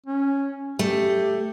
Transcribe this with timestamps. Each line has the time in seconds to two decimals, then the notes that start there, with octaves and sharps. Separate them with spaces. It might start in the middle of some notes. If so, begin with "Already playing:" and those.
0.06 C#4
0.79 A3 G4